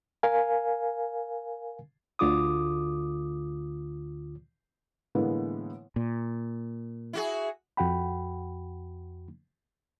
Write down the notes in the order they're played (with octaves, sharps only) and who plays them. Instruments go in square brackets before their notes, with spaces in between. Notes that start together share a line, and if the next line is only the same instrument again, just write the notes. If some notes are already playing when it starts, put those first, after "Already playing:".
[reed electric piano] A#4 F5 G#5
D2 D3 F4 D6 D#6
[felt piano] A2 D3 E3 G#3 A#3 B3
[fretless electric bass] A#2
[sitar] E4 F#4 G#4
[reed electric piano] F2 F#4 F#5 G5 B5